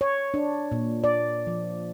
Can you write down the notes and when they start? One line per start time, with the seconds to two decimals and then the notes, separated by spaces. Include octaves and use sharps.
0.01 C#5
0.34 D4
0.72 A#2
1.04 D5
1.47 F3